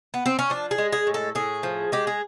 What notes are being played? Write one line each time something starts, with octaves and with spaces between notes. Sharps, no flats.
B3
C4
C#4
F3 D4
G#4
G#3
G#4
A2
A4
A2 G#4
F3
G#3 G4
G#4